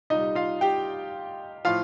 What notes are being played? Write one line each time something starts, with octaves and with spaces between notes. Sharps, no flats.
C2 A#2 G3 D#4 D#5
F4 F5
G4 G5
A2 F3 F4 F5